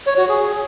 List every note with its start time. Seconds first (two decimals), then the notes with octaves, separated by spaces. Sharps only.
0.07 C#5
0.18 F#4
0.29 G#4